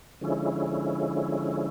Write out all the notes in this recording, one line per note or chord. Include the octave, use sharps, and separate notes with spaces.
D3 F3 G#3 C#4 E4